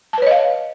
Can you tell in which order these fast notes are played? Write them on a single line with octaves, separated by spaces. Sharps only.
A5 B4 C#5 D#5 F5